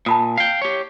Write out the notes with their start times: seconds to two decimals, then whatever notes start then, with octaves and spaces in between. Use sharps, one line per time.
0.06 A#2 A5 B5 D#6
0.38 F5 G5
0.62 G4 C#5